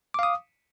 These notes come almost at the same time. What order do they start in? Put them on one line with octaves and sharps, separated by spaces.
D6 F5 D#6